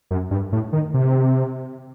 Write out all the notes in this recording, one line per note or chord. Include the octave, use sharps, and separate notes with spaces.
F#2
G2
A2
D#3
C3